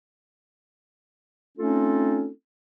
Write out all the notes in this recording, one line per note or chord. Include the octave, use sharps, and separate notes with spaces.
A3 C4 C#4 D#4 F4 A4